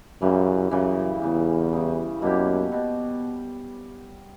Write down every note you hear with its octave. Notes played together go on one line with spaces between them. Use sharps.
F#2 C#3 E3 G3
F#2 C#3 E3 G3
E2 C#3 E3 G3
C#3 E3 G3
F#2 B2 A#3 E4 G4
B2